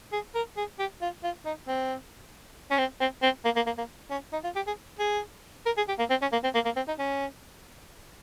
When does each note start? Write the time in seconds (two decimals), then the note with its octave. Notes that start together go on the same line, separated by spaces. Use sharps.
0.13 G#4
0.35 A#4
0.57 G#4
0.79 G4
1.02 F4
1.24 F4
1.45 D#4
1.67 C4
2.71 C#4
2.78 C4
3.00 C4
3.22 C4
3.45 A#3
3.56 A#3
3.66 A#3
3.78 A#3
4.10 C#4
4.33 D#4
4.44 F4
4.56 G4
4.67 G#4
4.99 G#4
5.66 A#4
5.77 G#4
5.88 G4
5.99 A#3
6.10 C4
6.22 C#4
6.32 A#3
6.44 C4
6.55 A#3
6.65 A#3
6.76 C4
6.88 D#4
6.99 C#4